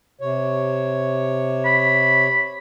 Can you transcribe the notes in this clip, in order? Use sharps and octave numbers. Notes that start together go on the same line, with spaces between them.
C3 C#5
B5